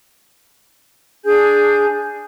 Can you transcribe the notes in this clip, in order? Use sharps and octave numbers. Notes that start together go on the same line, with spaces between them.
D4 G#4 G#5 G6